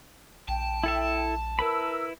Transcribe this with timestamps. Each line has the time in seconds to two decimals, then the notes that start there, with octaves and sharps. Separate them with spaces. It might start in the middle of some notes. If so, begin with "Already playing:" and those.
0.48 A#1 G5 A5
0.84 E4 A4 E5
1.59 E4 A#4 B4 B5 E6